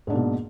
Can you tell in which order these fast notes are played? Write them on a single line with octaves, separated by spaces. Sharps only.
G#2 D4 A#3 B2